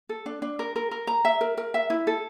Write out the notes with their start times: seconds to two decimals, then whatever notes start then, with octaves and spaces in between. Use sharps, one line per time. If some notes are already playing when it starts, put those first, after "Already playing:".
0.09 A4
0.26 D4
0.42 D4
0.59 A#4
0.76 A#4
0.91 A#4
1.07 A#5
1.25 E5
1.41 A#4
1.57 A#4
1.74 E5
1.90 E4
2.07 A4